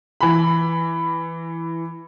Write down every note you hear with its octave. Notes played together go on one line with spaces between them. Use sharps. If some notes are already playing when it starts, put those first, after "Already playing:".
E3 B5